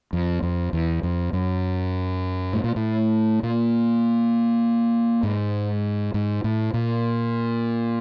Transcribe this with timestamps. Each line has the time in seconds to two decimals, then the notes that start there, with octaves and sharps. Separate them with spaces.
0.13 F2
0.42 F2
0.73 E2
1.03 F2
1.33 F#2
2.53 A2
2.64 A#2
2.76 A2
3.43 A#2
5.23 G#2
6.14 G#2
6.44 A2
6.74 A#2